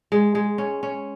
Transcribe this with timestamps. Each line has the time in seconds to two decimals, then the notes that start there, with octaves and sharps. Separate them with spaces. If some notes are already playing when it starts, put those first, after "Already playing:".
0.12 G#3
0.35 G#3
0.58 C#4
0.83 C#4